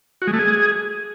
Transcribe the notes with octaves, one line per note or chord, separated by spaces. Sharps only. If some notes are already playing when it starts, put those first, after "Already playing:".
F#4
G#3
A3
G#4